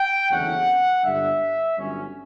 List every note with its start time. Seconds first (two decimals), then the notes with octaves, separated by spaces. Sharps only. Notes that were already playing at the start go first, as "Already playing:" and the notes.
Already playing: G5
0.30 F#1 E2 D3 A3 C#4 F#5
1.04 G1 G2 D3 E5
1.78 G1 G2 F#3 C#4